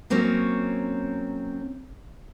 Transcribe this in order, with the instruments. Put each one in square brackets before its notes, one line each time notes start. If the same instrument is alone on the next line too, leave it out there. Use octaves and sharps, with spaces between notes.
[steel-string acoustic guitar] F#3 A#3 C4 C#4 C#5